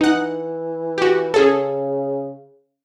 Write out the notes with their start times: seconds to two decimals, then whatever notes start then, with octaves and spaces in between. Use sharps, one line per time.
0.01 E3 D#4 F#5
0.98 F#4 G4
1.34 C#3 C#4 G#4 A4